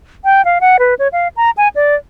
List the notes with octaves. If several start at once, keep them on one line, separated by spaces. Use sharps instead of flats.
G5
F5
F#5
B4
C#5
F5
A#5
G#5
D5